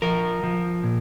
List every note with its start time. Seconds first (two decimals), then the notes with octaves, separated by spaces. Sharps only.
0.02 F3 A#4
0.43 F3
0.84 A#2